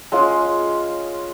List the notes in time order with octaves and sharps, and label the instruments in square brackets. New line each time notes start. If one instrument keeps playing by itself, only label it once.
[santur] G#3 C#4 F4